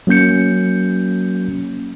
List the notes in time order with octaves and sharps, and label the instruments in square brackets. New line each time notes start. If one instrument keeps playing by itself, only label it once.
[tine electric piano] F#3 A#3 C#4 G6 C#7